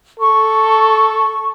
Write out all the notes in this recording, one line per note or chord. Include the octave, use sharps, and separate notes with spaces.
A4 C#6